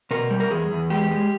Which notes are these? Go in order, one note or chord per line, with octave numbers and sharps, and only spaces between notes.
B2 A#4
G3
A#4
E2 G#4
E2
G#3 G4
G#3